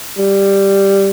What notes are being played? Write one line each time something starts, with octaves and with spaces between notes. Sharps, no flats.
G3